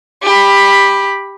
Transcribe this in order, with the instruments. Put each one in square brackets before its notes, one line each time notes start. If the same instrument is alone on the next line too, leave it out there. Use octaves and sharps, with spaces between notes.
[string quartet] G4 B5